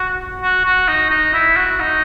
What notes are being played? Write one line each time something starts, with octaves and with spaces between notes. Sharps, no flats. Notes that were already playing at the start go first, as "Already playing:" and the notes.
Already playing: F#4
F#4
F#4
D#4
D#4
E4
F#4
D#4